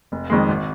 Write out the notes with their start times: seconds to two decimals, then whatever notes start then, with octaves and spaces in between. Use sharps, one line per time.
0.12 F1
0.30 F2 D#3 G#3
0.49 G#1